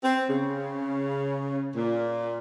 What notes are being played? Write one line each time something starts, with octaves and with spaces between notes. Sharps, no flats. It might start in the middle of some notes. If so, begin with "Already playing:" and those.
C4
C#3
A#2